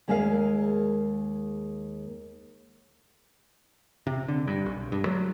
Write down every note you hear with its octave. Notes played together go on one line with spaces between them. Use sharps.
D#2 G#3 G#4 A#4 E5 F5
C3
D3
G2
B1
G2
F#3